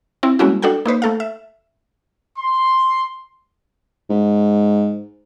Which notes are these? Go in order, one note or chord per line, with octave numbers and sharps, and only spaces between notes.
C4 E4
G3 G#3 A#3 C#4 E4 F#4
D4 F#4 A4 F#5 G5
A#3 D#4 B4 C5
A3 A4 F5
E5
C6
G#2